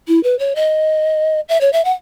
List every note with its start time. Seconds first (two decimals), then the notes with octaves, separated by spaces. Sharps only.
0.08 E4
0.23 B4
0.39 C#5
0.56 D#5
1.49 E5
1.61 C#5
1.73 E5
1.85 F#5